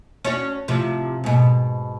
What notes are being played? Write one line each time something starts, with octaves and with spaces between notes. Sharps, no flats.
C#4 D4 F#4
A2 C3 F3
G#2 B2